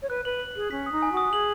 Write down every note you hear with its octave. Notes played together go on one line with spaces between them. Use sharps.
C#5
B4 F#6
B4 F#7
F#7
G#4 F#7
C#4 B6
D#6
D#4
G#5
F#4 D#6
G#4 F#7